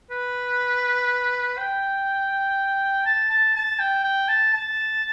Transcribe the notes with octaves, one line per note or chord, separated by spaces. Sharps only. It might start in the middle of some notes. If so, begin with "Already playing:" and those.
B4
G5
A5
A5
A5
G5
G5
A5
A5